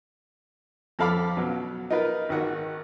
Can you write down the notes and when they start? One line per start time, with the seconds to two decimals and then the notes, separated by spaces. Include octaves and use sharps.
0.99 F2 A4 F5 B5 D6
1.37 B2 F#3
1.90 D#4 F4 A#4 B4
2.29 G#1 D#3 F#4 F#5